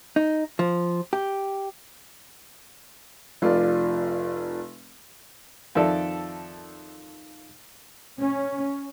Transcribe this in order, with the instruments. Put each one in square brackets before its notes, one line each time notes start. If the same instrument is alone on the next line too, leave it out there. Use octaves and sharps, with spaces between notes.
[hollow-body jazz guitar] D#4
F3
G4
[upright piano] F1 F4 D5
[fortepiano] F2 D#3 A4 D5 E5
[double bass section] C#4